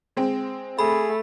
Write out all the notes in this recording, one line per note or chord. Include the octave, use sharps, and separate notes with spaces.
G#3 C4
A3 G#4 B5